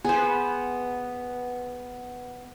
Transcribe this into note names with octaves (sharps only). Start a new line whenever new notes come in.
B3 G#4 C5